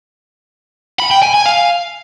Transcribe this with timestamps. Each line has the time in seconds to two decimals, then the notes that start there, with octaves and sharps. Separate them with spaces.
1.00 B5
1.11 G5
1.23 G#5
1.34 G#5
1.46 F5